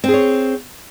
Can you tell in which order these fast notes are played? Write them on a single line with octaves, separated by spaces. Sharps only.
C4 G#4 C#5